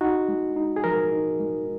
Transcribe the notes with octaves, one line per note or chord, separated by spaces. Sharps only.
D#4 F#4
G#3
D#4
G#4
F3 A#4
D#4
G#3